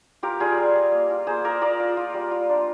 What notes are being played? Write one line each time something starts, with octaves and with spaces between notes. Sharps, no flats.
F4 G4 A#4
G3 F4 G#4
G3
G3
A#3
F4
A#3 G#4 C5
F4 A#4 D5
F4 A#4 D5
F4
F4
G3
F4
D4